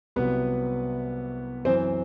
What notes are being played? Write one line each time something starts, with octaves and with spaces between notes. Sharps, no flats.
C2 C3 F#3 B3 B4
F#2 E3 C4 C5